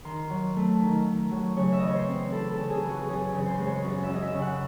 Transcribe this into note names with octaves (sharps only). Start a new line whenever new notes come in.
D#3 C6
F#3
A3
D#3
D#3
F#3
C#3 C#5
E5
E3 D#5
C#5
C5
C4
E4 A4
A4
C#3
G#4
E3
F#4
F#2 G#4
C#3
C5
G#3
C#5
F#2
E5
F#2
D#5
E5
C#3
F#5